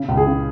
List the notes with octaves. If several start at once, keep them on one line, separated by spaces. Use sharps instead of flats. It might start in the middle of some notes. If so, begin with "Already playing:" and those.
Already playing: C#3
C#2
G#4
C#3